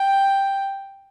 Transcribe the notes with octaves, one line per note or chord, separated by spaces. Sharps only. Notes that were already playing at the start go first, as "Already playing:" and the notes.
Already playing: G5